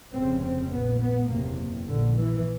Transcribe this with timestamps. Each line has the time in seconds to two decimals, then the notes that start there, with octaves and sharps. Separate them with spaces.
0.12 F1 F2 C#3 C4
0.41 C4
0.70 A#1 A#2 B3
0.99 B3
1.28 F#1 E2 C3 A#3
1.86 A#1 A#2 D3
2.16 E3